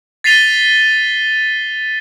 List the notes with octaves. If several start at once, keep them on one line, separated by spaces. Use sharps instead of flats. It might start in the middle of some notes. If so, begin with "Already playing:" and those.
A6 B6 C7 D#7 F7 G7